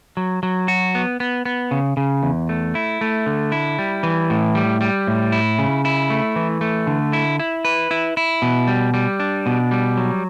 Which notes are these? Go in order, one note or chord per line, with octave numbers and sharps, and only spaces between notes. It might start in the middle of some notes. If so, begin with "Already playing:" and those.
F#3
F#3
F#4
B3
B3
B3
C#3
C#3
E2
A3
E4
A3
D3
E4
G3
E3
A2
G3
G3
A2
E4
C#3
E4
A3
E3
A3
D3
E4
E4
B4
E4
E4
B2
G3
G3
D4
B2
G3
F#3